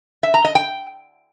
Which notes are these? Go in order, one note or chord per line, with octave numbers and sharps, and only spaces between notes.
E5
A#5
D#5
G5